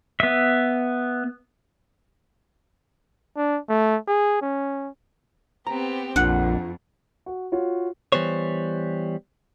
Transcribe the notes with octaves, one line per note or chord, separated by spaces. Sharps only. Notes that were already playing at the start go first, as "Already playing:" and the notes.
B3 E5
D4
A3
G#4
C#4
B3 C4 G4 A#5
A#1 F2 D4 F4 F#5
F#4
F4 F#4 C#5
E3 G3 B3 C5 C#5